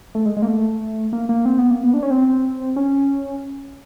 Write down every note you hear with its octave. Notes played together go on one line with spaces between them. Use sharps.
A3
G#3
G#3
A#3
A3
A#3
A#3
C4
B3
A#3
B3
D4
C#4
C4
C#4